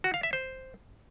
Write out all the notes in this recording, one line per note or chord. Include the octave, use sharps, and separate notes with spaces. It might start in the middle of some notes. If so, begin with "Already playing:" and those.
F#4
F5
E5
C5